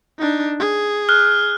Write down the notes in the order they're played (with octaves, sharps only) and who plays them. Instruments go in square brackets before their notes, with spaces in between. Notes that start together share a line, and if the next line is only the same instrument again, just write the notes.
[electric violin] D4 D#4
G#4
[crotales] F6 F#6